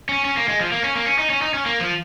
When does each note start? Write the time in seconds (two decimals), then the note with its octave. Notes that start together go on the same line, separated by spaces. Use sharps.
0.09 C#4
0.25 C#4
0.37 A#3
0.48 G#3
0.61 F3
0.72 A#3
0.84 C#4
0.96 A#3
1.06 C#4
1.19 D#4
1.30 C#4
1.42 D#4
1.54 C#4
1.66 A#3
1.81 F3